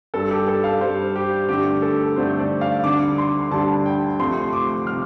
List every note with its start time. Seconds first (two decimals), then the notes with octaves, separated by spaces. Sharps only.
0.14 G2 G3 A4
0.31 G4
0.48 A4
0.64 F5
0.81 G2 G3 C5
1.16 G4
1.49 G2 D3 A3 G4
1.82 A4
2.16 G2 D3 A3 C5
2.39 D5
2.61 F5
2.84 D2 D3 G3 D6
3.18 C6
3.51 D2 D3 G3 A5
3.86 G5
4.19 C2 C3 F3 A3 C6
4.53 D6
4.87 C3 F3 F6